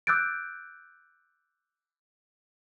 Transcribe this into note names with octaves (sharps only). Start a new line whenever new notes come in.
D6 E6 F#6 G6 A6 D7